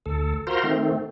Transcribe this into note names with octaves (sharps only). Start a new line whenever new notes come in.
D2 A4
F4 F#4 A#4 C5 A#5 C6
D#3 A3 C4